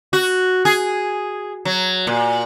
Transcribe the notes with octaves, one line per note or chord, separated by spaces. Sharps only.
F#4
G#4
F#3
A#2